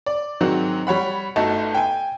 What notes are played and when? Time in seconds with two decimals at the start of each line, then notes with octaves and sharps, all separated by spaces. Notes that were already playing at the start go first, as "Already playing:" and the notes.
0.06 D5
0.41 G#2 D#3 F#3 C4 F#4
0.87 G3 C#5 F#5 B5
1.36 G1 A3 D#4 F#4 A5
1.74 G5 G#5